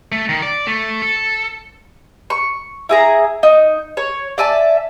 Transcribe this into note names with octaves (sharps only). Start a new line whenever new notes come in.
A3
D#3
D5
A3
A4
C#6
E4 G#4 A#5
D#4
C#5
D5 E5 G#5 A5